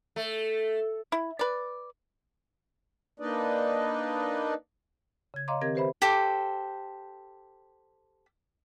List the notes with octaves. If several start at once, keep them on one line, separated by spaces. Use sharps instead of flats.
A3
E4
B4 D5
A#3 D4 D#4 B4 D5 D#5
C#3 G#6
C#5 D#5 F5 A#5 C6 D6
D#3 C4 G4 A#4 D#5 G#6
G4 B4 C5 E5 B5
G4 A4 C5